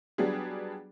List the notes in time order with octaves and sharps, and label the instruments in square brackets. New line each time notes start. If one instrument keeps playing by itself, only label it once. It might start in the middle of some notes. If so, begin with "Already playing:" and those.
[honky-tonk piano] F#3 G3 B3 D4 G4 G#4